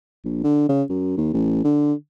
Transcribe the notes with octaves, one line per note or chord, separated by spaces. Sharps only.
A#1
D3
C#3
F#2
D#2
A1
D3